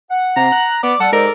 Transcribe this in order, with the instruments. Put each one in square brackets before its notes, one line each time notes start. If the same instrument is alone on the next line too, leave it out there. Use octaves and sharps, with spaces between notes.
[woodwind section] F#5
[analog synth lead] C3 [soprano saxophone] A#5
[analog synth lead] F#6
[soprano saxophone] B3 [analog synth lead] D5
[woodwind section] G3 [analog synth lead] A4 [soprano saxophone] F#5
[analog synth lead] G#2 [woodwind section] A4 D5 [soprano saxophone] A#4